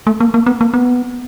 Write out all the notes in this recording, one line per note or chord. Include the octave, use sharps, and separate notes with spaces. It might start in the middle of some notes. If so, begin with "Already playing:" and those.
A3
A#3
A#3
B3
A#3
B3